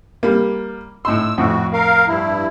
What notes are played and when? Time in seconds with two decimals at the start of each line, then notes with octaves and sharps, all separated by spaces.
0.23 G3 A#3
1.05 A2 D#4 C6 E6
1.38 F2 A2 F#4
1.73 A#4 F5
2.08 G2 E4